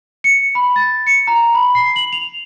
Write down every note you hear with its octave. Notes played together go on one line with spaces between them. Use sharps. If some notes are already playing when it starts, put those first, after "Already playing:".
C#7
B5
A6
C#7
A#5
B5
C7
F#7
F7